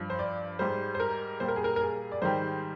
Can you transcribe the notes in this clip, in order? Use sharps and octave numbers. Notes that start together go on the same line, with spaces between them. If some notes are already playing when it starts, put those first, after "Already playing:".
Already playing: G2 F3
C5
D5
G#2 G3 C5
C5
A#4
A#2 G3 C5
A#4
G#4
A#4
A#4
G#4
D5
G#2 D#3 G3 C5